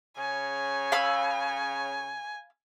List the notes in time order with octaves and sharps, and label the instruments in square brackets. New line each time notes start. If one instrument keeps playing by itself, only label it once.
[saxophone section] C#3 C#5 [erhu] G#5
[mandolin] F5 B5 E6